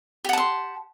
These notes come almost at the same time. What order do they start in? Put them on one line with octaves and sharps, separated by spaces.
G4 F#5 A5 C6